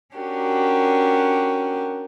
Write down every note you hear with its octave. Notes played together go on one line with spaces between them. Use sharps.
C#4 D4 F#4 G4 A#4